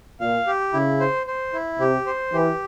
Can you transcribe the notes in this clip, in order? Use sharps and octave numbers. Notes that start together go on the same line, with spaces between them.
A#2 F5
G4
C#3 E4
C5
C5
E4
C3 G4
C5
E3 G4